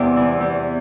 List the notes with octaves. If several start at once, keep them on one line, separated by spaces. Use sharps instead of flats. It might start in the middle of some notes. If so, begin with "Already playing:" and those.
Already playing: E2 C3 D5
E3
E2